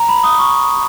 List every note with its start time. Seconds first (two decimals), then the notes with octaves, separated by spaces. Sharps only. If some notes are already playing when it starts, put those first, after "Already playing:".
Already playing: A#5
0.08 B5
0.23 D#6
0.39 C#6